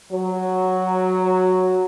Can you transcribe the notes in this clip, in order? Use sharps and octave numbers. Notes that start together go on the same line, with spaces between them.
F#3